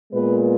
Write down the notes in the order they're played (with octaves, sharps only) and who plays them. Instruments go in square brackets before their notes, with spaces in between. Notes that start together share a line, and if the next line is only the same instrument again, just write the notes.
[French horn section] A#2 G#3 B3 B4